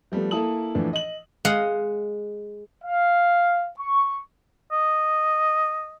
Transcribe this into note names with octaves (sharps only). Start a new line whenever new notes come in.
F3 G3 A3 B3
A#3 E4 A4 A5 D#6 F#7
A2 E3 F3 D4
D#5 F#7
G#3 D#5 F5 F#5
F5
C#6
D#5